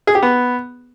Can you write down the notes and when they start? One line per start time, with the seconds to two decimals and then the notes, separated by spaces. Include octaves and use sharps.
0.07 G#4
0.15 G4
0.23 B3